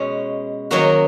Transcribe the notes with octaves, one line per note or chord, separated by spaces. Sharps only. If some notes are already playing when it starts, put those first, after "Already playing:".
Already playing: B2 G#3 C#4
D#3 F#3 A#3 C#4 F#4